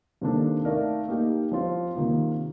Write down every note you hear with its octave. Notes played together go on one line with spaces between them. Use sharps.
C3 D#3 A#3 D4 A4
A3 D#4 A#4 D5 F5
A#3 D#4 G4
F3 C4 F4
C3 D#3 A#3 F4